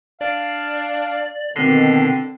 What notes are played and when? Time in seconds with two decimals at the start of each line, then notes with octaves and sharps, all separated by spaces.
0.21 D4 D5 F5
1.56 B2 D3 D#3 C4 C7